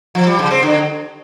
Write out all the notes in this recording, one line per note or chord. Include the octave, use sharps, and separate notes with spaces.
F3
G3
C#3
C4
D3